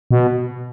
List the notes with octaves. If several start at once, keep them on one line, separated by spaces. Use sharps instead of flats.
B2